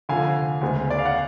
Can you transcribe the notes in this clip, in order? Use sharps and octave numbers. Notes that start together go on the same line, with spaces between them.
F1 F2 D3 F5 G#5
D2 C#3 G#3 B3
D5
F5
F#5